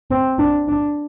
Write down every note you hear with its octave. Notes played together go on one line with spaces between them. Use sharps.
C4
D4
D4